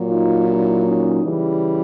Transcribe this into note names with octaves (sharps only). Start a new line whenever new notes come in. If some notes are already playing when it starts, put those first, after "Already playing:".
Already playing: A#2 F#3
D#4 F4
D4 E4
C#4 D#4
C#3 E3 G3